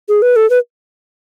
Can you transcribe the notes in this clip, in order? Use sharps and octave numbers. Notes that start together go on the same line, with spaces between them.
G#4
B4
A4
B4